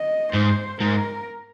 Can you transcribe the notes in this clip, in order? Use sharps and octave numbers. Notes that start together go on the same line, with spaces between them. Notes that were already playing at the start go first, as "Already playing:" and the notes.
Already playing: D#5
G#2 C5
G#2 A#4